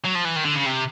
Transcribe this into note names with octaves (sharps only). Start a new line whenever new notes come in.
F#3
F3
E3
D#3
D3
C#3
C3